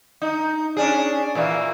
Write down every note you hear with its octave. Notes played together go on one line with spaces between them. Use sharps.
D#4
C#4 D4 G#4
A#2 E3 A#3